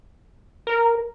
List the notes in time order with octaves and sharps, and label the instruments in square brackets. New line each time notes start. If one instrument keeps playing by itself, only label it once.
[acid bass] A#4